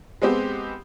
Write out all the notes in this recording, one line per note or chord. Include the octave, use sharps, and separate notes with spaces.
G#3 B3 C4 G4